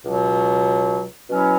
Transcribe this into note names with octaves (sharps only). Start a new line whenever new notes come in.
C#2 B2 F#3
B2 F#3 C#4 E4